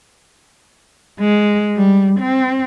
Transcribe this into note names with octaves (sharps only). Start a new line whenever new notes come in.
G#3
G3
C4